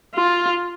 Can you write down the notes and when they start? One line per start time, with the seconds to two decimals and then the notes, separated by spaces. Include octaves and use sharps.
0.15 F4